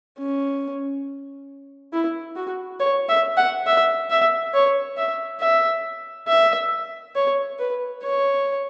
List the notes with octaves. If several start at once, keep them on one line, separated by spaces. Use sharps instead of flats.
C#4
E4
F#4
C#5
E5
F#5
E5
E5
C#5
E5
E5
E5
C#5
B4
C#5